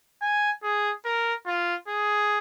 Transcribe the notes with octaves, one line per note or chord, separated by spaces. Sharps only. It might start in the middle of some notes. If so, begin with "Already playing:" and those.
G#5
G#4
A#4
F4
G#4